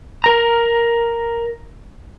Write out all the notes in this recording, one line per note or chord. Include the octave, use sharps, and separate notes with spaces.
A#4 A#5